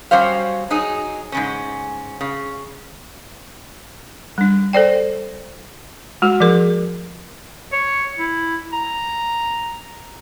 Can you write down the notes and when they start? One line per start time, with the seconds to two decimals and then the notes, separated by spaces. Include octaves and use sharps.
0.11 F#3 G3 C#4 C5 F5
0.71 F#3 D#4 G#4
1.32 G#2 C#3 C#4
2.21 C#3
4.38 G3 D4
4.73 A4 C5 D5 G5
6.22 G#3 F#4
6.40 F3 G#4 A#4
7.72 C#5
8.19 E4
8.73 A#5